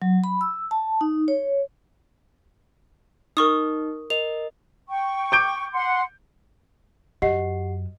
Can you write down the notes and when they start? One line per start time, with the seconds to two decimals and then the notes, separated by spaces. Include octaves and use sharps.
0.02 F#3
0.24 B5
0.41 E6
0.71 A5
1.01 D#4
1.28 C#5
3.37 D#4 A#4 C#6 D#6
4.10 A#4 D#5 F7
4.87 G5 C#6
5.32 D6 G6 D7
5.72 F#5 C6
7.22 F#2 G4 D#5 F#5 C7